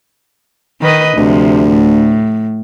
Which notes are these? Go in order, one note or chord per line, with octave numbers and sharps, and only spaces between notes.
D#3 B4 D#5
D2 C3 F3
A2